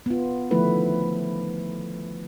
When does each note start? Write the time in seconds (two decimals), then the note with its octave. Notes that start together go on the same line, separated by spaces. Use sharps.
0.06 B3 F4
0.51 D3 D#3 F3 A3 E4 B4